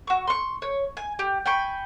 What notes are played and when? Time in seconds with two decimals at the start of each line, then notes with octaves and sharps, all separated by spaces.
0.07 F#4 C#6
0.27 C6 C#6
0.62 C#5
0.97 G#5
1.19 G4
1.46 G5 G#5 B5 C#6